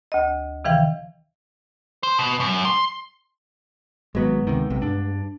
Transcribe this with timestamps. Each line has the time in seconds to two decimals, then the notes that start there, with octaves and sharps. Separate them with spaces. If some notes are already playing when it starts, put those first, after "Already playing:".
0.12 D2 D#5
0.65 C3 D#3 E3 F5 G5
2.03 C5
2.19 B2
2.40 F#2
2.65 C6
4.15 G#1 F#3 G#3 B3
4.47 D2 C3 D#3
4.70 B1 C3
4.82 G2 D4